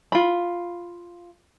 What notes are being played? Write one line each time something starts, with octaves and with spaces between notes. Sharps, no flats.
F4 B5